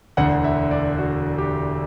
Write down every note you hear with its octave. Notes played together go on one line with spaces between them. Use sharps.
E1 D2 D3 F#5
E5
D5
F#4
G4